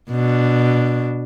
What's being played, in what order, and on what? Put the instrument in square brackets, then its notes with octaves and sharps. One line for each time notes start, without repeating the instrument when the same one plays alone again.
[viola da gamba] B2 D4